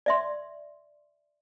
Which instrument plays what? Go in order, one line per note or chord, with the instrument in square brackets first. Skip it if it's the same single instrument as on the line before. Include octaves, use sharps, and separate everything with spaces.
[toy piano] D5 E5 C6